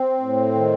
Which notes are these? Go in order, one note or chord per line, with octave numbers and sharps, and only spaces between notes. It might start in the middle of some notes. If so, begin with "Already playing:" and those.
Already playing: C4
A2
D#3